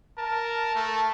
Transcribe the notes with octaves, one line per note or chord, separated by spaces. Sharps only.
A#4 A5
A3